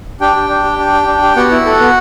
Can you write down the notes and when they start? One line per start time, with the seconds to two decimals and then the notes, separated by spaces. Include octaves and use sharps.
0.21 D4 G4 G5
0.36 G4
0.49 D4
0.64 G4
0.79 D4
0.93 G4
1.07 D4
1.22 G4
1.36 B3 F#4 F#5
1.51 E4
1.66 A4
1.80 B3